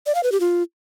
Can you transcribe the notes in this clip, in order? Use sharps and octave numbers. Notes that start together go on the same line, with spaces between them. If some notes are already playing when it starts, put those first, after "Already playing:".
D5
F5
B4
G4
F4